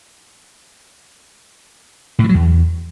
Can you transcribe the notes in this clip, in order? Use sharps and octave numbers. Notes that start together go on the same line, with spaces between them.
A2
E3
F#3
E2